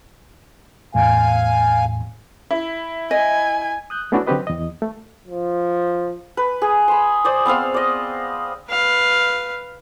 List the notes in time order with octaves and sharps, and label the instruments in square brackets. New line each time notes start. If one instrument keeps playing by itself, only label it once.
[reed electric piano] E2 A2 [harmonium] F5 G#5
[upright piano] E4
[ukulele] D#5 [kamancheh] G#5
[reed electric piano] D#6 F#6 G6
A3 B3 C#4 D4 E4 F#4
D3 F#3 C4 G4 B4 D#5
E2 D#5
A3
[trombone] F3
[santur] B4
G#4
B5 C6
C5 D5 D#6
B3 C4 C5 F5
D5 D#5
[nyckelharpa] B4 F5